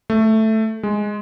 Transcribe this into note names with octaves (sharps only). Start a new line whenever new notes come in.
A3
G#3